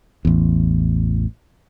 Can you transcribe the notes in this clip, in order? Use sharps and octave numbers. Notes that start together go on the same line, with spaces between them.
A1 E2